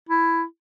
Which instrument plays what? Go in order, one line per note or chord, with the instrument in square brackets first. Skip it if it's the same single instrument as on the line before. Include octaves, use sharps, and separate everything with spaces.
[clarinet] E4